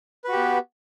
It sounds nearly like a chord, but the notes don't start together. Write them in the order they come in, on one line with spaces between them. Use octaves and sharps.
B4 F#4 G4 B3